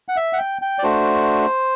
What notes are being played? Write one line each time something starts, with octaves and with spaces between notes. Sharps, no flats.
F#5
E5
F#5
G5
G5
D5
A3 D4 F#4 C5